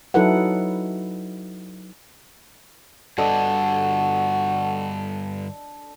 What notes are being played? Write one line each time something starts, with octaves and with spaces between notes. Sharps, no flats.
F#3 D#4 E4 A4 B4 F#5
G2 D3 D4 F#4 A4 D#5